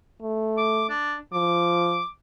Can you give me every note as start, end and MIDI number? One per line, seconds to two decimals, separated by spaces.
0.22 0.90 57
0.57 0.87 86
0.89 1.17 62
1.33 2.01 53
1.33 2.07 86